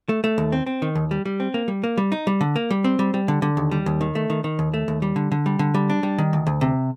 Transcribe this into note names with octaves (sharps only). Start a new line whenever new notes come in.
A3
A3
D#2
C4
C4
D#3
D#2
G3
G3
C4
A#3
G3
A#3
G3
D#4
G3
D3
A#3
G3
C4
G3
G3
D3
D3
D#2
G3
D#2
D#3
A3
D#3
D#3
D#2
A3
D#2
G3
D3
D3
G3
D3
G3
D4
G3
D#3
D2
D2
C3